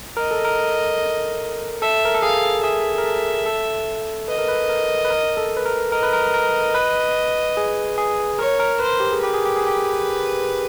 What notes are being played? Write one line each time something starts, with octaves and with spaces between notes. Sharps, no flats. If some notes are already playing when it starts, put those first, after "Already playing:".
A#4 D#5
A4
A#4
A4 E5
A#4
A4
G#4 F5
G#4 E5
A#4
A4
A4
B4 D#5
A#4
B4
A#4
B4
A#4
A4
B4
A#4
A#4 D#5
B4
A#4
A#4
B4
G#4
G#4
A#4 C#5
A#4
B4 C5
G4
G#4
G4 B4
G#4
G4
G#4
G4